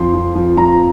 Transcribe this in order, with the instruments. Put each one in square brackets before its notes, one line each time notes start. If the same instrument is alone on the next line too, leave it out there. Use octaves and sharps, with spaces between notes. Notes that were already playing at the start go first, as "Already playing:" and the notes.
Already playing: [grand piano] F2 F3 C6
F3
F3
F3 A#5